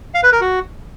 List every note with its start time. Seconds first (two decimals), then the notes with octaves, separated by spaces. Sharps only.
0.14 F5
0.23 B4
0.32 A#4
0.41 F#4